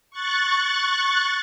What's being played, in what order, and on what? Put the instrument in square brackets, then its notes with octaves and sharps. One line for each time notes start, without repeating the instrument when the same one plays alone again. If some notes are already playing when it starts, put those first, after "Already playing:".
[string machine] C#6 F#6 A6